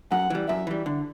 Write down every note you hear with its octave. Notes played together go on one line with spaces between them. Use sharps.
F#2 F#5
E3 G3
F#2 E5
E3 G3
D3